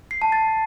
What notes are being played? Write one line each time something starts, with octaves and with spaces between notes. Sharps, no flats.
C7
A5
A6